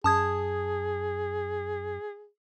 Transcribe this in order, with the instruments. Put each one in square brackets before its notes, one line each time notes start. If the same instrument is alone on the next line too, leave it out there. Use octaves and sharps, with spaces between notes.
[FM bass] F#2 [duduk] G#4 [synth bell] A5 D#6 G#6